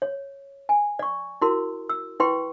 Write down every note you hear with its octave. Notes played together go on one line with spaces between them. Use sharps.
C#5
G#5
D5 C#6
E4 F#4 A#4 C6
E6
E4 B4 G5 C6 C#6